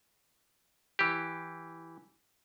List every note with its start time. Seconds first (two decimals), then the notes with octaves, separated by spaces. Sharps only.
0.99 E3 G4